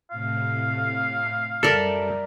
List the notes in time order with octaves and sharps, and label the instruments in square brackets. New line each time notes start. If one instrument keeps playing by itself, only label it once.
[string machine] A2 C3 [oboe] F5
[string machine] F#2 G3 [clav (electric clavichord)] A4 [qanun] A#4 D5 E5